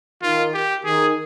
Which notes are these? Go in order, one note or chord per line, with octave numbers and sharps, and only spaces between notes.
D#3 F4
G4
D#3 G#4